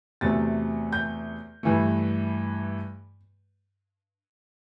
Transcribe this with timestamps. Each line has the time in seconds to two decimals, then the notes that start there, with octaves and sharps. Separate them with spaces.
0.21 E2 C3 F#3 A3 A6
0.92 G6
1.63 G2 E3 A3